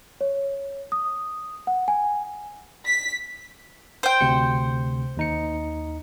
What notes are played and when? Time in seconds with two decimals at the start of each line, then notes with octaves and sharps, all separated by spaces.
0.21 C#5
0.92 D#6
1.67 F#5
1.88 G#5
2.87 B6
4.03 C5 G5
4.21 D2 C3 C#7
5.17 D#2 D#4 C#7